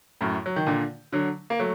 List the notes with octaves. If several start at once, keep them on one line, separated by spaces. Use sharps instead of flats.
F#2 A2
F#3
D#3
A#2 D3
D3 F#3
A#3
F#3 A3